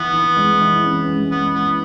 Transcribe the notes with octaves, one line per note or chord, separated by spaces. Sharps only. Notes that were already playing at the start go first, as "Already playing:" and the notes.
Already playing: E3 B3
E3
G#3
E3
C#4
G#3
G#3 B3
B3 E4